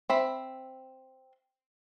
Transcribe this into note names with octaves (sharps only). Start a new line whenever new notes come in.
C4 E5 B5